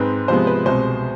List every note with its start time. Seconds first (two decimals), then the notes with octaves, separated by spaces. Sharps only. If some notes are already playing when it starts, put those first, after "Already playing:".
Already playing: G#2 G#3 C4 B4
0.28 C3 F3 G#3 B3 C5
0.47 B4
0.66 C2 B2 G#3 C5